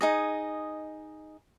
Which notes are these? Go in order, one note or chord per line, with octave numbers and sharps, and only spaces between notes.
D#4 G#4 D#5